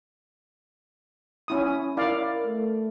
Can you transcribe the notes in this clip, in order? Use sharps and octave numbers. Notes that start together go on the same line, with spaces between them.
C#4 E4 D#6
E4 A#4 D5 F5
A3